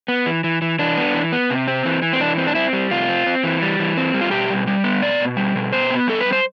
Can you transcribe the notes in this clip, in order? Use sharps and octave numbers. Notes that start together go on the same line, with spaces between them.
B3
E3
E3
E3
E3 D4
B3
E3
B3
C3
C4
E3
E3
C4
E3 D4
C4
D4
C4 E4
G3
C3 F4
C4
C4
E3
G3
E3
C4
G3
F4
B2 G4
G3
G3
B3
B2 D5
B2
G3
B2
B3 C5
B3
G3 A4
G3 B4
C5